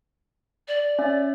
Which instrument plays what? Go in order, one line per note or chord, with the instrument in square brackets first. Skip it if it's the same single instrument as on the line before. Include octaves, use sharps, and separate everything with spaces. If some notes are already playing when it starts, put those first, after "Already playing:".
[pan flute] D5
[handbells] C#4 E5